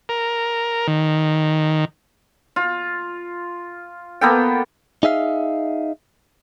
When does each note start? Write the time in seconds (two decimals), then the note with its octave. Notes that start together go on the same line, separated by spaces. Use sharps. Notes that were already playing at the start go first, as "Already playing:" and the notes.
0.09 A#4
0.87 D#3
2.56 F4
4.21 A#3 B3 A4 G5
5.03 D#4 G#4 E5 F5